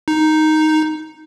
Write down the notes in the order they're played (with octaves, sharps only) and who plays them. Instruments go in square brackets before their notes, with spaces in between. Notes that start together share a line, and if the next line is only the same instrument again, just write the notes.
[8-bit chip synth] D#4